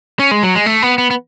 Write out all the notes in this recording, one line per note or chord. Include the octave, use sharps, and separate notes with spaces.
C#4
G#3
F#3
G#3
A3
B3
B3
B3